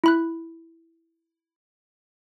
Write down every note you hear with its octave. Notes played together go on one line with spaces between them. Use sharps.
E4 B5 F#6